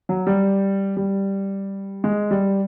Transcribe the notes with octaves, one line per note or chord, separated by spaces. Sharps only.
F#3
G3
G3
G#3
G3